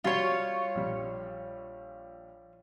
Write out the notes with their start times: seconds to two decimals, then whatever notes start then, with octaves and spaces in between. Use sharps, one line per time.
0.04 G3 F4 F#4 C#5
0.75 A#1 G3